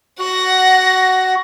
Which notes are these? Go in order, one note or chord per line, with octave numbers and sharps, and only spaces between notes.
F#4 F#5 A#6